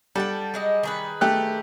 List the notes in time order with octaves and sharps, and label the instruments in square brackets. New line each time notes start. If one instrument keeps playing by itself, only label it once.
[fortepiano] G3 [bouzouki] A4 F#5 G5
[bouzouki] F#3 G#3 D#5
D#3 G#4 B4
[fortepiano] A3 G4 F#6